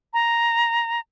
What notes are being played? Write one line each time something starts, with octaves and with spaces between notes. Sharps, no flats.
A#5